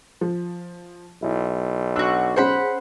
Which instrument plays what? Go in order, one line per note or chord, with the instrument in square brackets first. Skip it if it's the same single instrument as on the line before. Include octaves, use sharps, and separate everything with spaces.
[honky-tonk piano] F3
[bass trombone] B1 [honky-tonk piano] E4
[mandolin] D4 F#4 [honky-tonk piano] E6
[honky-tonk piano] C#4 G#4 [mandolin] C5 F#5 B5